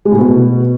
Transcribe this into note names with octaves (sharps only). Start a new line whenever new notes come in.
G#3
A2
B2